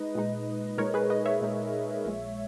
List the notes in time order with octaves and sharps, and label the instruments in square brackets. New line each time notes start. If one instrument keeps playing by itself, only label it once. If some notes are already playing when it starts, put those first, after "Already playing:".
Already playing: [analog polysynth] G#3 D#4 B4 D#5
A#2 G#3 D#4
A#2 G#3 D#4 A#4 C#5
G#4 B4
B4 D#5
C#5 E5
A#2 G#3 D#4
A#1 A#2 G#3